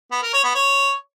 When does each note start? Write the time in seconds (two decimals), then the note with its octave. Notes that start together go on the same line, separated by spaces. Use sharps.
0.12 B3
0.22 A#4
0.33 C#5
0.44 B3
0.55 C#5